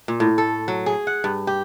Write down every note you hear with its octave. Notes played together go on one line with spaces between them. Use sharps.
A#2
A2
A4
F#3
G#4
F#5
G2
G4